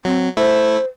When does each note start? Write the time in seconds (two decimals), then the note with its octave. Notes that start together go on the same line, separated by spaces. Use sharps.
0.05 F#3 C4
0.37 A3 E4 C5